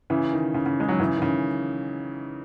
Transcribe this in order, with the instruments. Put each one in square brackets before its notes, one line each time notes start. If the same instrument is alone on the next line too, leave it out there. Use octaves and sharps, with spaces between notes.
[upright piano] C#3 E3
D#3
C#3
C#3
G#3
D#3 F#3
C#3 E3
D#3
C#3